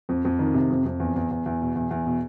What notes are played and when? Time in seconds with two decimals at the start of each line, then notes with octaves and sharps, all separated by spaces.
0.09 F2
0.25 F2
0.39 D#3
0.54 C3
0.70 F2
0.85 F2
1.00 E2
1.16 E2
1.31 E2
1.46 E2
1.61 B2
1.75 E2
1.91 E2
2.06 B2